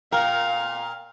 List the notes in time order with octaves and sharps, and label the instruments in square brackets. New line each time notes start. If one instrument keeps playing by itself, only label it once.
[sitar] A#2 A#4 [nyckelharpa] F5 [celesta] G5 F6